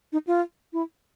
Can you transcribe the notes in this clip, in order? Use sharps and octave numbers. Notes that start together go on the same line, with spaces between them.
D#4
F4
E4